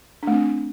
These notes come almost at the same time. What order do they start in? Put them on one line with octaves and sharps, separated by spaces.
D4 A3 C4